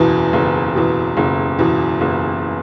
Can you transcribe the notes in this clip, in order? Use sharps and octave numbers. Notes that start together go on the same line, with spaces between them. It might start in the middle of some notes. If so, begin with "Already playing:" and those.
Already playing: F#1 E2 B2
F#1
E2 B2
F#1
E2 B2
F#1